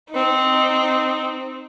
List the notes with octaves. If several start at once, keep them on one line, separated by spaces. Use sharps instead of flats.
C4 D#4